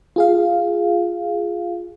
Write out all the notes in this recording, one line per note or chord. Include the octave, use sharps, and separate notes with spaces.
F4 G#4 F5